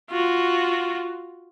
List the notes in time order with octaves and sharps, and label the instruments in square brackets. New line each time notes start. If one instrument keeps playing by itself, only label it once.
[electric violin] F4 F#4